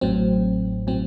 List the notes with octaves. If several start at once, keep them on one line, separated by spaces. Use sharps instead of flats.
A1 A2 F#3 C4
A2 F#3 C4